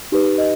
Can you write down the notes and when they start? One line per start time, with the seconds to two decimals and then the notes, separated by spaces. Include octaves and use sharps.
0.12 D#4 G4 B4
0.38 D#5